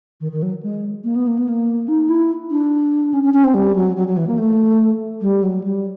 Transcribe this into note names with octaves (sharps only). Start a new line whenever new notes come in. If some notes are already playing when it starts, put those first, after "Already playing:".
D#3
D#3
F#3
G#3
A#3
B3
A#3
B3
A#3
D#4
E4
D4
C#4
C#4
C#4
C4
G3
F#3
F#3
F#3
E3
A#3
A3
G3
F#3
G3